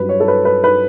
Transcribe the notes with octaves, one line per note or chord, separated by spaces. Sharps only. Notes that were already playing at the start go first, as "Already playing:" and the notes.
Already playing: G2 F#3 C#4 B4
C#5
A4
B4
B4
B4